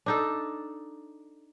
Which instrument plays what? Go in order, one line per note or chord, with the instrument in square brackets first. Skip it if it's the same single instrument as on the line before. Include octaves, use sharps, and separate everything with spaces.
[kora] D4 D#4 A4